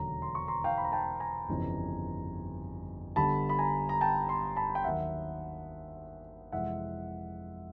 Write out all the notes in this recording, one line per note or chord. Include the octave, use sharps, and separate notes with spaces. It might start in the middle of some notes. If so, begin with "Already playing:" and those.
Already playing: E1 D#2 D3 F#3 A#5
C6
C#6
A#5 C6
F5 G5
B5
A#5
G5 A5
G#5 A#5
G1 F2 C#3 E3 G3
G1 G2 D3 G3 A5 B5
B5
G#5 A#5
A#5
G5 A5
A#5 C6
A5 B5
G5
D#2 D#3 F#3 E5 F#5
F2 C3 E3 G#3 E5 F#5